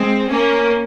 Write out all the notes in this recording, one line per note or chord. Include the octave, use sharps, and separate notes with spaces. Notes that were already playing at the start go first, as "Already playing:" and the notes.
Already playing: G#3 C4
A#3 C#4